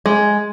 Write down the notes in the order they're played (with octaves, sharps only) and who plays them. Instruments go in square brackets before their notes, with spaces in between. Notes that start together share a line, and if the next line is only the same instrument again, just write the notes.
[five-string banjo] G#3